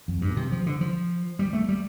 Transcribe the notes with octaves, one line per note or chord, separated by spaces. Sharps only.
F2
G2
A2
C3
F3
D3
F3
G3
A3
G3